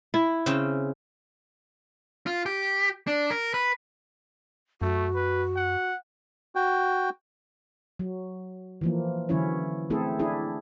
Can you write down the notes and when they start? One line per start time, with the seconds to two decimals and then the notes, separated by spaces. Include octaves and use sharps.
0.14 E4
0.46 C#3 C4 C#4
2.26 F4
2.46 G4
3.07 D4
3.30 A#4
3.54 B4
4.82 F#2 A3 F#4
5.15 B4
5.56 F#5
6.55 F#4 G5
7.99 F#3
8.81 E3 F3 A#3
9.29 D3 E3 F#3 C#4 E4 C#5
9.90 A3 C4 E4 G#4 A4
10.19 D4 E4 G#4